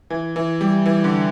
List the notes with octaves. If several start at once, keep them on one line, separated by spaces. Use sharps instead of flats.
E3
E3
G3
E3
D3